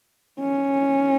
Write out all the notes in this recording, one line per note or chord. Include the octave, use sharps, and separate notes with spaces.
C#4